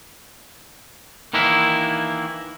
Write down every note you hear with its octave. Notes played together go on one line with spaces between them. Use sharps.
D#3 E3 A#3 D4 E4